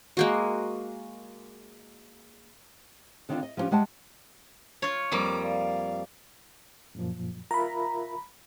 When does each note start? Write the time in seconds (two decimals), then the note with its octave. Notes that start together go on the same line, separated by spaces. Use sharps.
0.17 G#3 A#3 F#4
3.29 D3 D#3 C4 D4 D#4 F4
3.43 D#5
3.57 F3 B3 C#4 D4 G4
3.71 G3 G#3 F#5 G5 A5
4.82 F4 C#5
5.12 F2 G3 A#3 D6
5.43 D5 F5
6.95 F#2 A#2 F3
7.51 F4 A#4 E5 A#5 B5